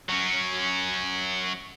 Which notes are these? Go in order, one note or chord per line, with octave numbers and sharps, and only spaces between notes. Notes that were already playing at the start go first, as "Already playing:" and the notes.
F#3 C#4